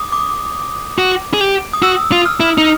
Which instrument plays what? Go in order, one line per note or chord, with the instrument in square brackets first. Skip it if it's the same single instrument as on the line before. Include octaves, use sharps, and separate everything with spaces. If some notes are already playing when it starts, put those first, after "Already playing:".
Already playing: [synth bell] D6 D#6
D6
[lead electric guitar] F#4
G#4
G4
[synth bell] D#6
[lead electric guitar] F#4 [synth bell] E6
[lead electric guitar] F4
[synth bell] F6
[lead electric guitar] E4
D#4